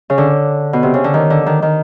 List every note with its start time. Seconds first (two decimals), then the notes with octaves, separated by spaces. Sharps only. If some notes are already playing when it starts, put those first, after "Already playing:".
0.10 C#3
0.18 D3
0.73 B2
0.83 C3
0.94 C#3
1.04 D3
1.14 D#3
1.30 D3
1.46 D#3
1.62 D#3